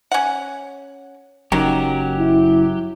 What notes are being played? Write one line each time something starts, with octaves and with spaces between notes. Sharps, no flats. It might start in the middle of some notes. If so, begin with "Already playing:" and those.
C#4 F#5
F#1 F#2 D#3 F#3 G4
E4